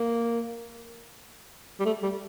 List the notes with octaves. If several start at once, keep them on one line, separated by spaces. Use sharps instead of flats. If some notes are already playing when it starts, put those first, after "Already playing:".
Already playing: A#3
G3
A3
G3